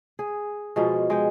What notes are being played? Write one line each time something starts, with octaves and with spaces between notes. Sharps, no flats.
G#4
B2 F3 G#3
G#3 G5